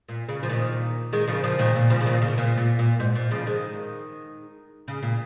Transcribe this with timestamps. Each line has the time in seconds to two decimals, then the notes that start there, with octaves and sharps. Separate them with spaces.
0.09 A#2
0.29 C#3
0.43 F3
0.49 A#2 D#3
1.13 D#3 G#3
1.28 C#3 F3
1.44 C#3 F3
1.59 A#2 D#3
1.75 A#2
1.90 C#3 F3
2.01 C#3
2.06 A#2 D#3
2.22 C#3
2.38 A#2
2.58 A#2
2.79 A#2
3.00 G#2
3.15 A#2
3.31 C#3 F3
3.47 D#3 G#3
4.88 C#3
5.03 A#2